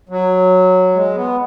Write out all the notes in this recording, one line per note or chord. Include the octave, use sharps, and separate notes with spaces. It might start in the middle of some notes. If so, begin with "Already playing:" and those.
F#3
G#3
B3